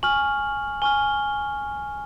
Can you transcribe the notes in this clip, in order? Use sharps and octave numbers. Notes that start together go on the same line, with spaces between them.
G#5 C#6 F6 F#7
G#5 C#6 F6 G7